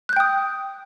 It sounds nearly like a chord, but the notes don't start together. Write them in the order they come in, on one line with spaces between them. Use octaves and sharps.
F#6 G6 G5 D#6